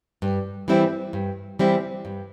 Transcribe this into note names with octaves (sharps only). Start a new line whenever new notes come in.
G2
E3 G3 C4 E4
G2
E3 G3 C4 E4
G2